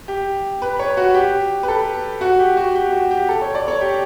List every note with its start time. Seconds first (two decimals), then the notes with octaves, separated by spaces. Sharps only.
0.08 G4
0.62 B4
0.79 C#5
0.97 F#4
1.15 G4
1.63 B4
1.68 A4
2.21 F#4
2.39 G4
2.57 F#4
2.75 G4
2.92 F#4
3.11 G4
3.29 A4
3.42 C#5
3.55 D5
3.68 C#5
3.81 G4